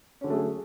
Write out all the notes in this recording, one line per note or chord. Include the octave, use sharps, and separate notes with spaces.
D3 F#3 A3 C#4 G#4